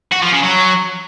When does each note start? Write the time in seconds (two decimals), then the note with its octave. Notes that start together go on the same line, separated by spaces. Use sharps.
0.12 F#4
0.22 F3
0.33 C#3
0.43 F#3